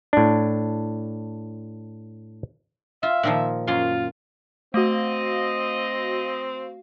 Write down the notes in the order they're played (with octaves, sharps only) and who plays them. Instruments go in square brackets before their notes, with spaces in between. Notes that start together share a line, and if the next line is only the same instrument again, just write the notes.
[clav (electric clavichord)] A2 D4
[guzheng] F4 [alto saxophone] E5
[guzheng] A#2 D#3 F3
[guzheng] F#2 C6 [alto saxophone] F4
[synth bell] A3 [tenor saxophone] C4 [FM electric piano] F#4 F5 [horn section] D#5